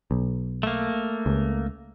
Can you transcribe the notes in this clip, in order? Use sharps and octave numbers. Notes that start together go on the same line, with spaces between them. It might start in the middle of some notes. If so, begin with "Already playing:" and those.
B1
A3 A#3
C#2